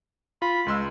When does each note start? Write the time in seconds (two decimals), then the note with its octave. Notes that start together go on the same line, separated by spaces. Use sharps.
0.42 F4 B5
0.66 C#2 G#3 C6 E6